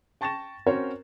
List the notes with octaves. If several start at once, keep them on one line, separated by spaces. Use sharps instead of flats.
G5 A5 C#6 A6 A#6 E7
C4 C#4 F#4 A#4 C5 C#5